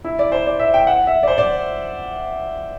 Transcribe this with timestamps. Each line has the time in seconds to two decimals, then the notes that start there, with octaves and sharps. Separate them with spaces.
0.04 E4
0.19 D5
0.32 C5
0.46 D5
0.59 E5
0.74 G5
0.87 F#5
1.07 E5
1.23 D5
1.28 C5
1.38 D5